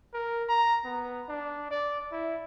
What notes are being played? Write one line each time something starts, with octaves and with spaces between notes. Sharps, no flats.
A#4
A#5
B3
D4
D5
E4